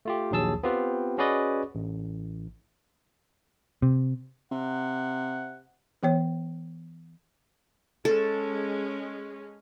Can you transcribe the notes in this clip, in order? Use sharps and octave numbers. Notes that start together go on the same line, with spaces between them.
A3 F4 G4
A#1 D#2 F#3 G#4 A5 E6
B3 C4 F4 G4 B4
C#4 F#4 G#4 B4 D5 D#5
A1
C3
C3 F#5
E3 B3 C#5
G#3 C#4 A4